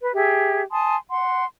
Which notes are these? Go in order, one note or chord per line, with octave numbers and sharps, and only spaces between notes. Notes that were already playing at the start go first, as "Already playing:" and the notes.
B4
G4 G#4 E5
G#5 A5 C6 D#6
F#5 C6